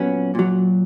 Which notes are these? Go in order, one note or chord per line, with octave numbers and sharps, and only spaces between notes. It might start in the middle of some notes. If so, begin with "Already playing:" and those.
Already playing: A#2 F#3 B3 C#4
A#2 F#3